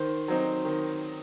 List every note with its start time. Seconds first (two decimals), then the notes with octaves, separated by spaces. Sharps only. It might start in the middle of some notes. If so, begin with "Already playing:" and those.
Already playing: D#3 C5
0.28 F#3 C4 D#4
0.65 D#3